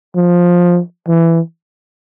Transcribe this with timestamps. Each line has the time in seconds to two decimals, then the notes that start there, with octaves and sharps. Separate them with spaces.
0.16 F3
1.08 E3